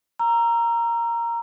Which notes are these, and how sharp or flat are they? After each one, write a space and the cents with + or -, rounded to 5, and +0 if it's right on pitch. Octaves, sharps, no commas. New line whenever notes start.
A#5 +0 E6 +35